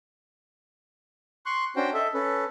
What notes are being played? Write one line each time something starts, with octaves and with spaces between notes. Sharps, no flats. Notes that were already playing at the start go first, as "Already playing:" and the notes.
C6 C#6 F#6
C#4 D4 F#4 C5 G5
A4 D#5 E5
C#4 A4 B4